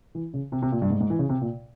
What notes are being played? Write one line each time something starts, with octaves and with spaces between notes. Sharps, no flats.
E3
C#3
C3
C3
A#2
G2
G#2
G#2
E3
C#3
C3
A#2